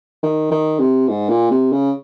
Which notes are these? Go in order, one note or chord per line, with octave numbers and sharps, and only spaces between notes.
D#3
D#3
C3
G#2
A#2
C3
C#3